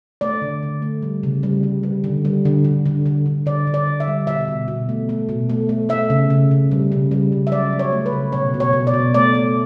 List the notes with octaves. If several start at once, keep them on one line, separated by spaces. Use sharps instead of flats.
A3 D5
D3
D3
A3
G3
C#3
G3
G3
G3
D3
G3
D3
D3
D3
D3
D3
D3 D5
D3
D5
D3
E5
G3
B2 E5
B2
B2
A3
A3
B2
A3
A3
A3 E5
C#3
C#3
C#3
G3
C#3
G3
C#3
E5
F#3 D5
F#3
C#5
A3
B4
C#3
B2 C#5
B2
C#5
B2
D5
B2
A3 D5
A3